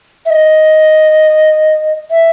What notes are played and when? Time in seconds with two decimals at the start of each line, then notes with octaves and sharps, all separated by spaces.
0.26 E5
0.30 D#5
2.11 E5